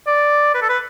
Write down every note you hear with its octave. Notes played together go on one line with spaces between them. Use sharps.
D5
B4
A4
B4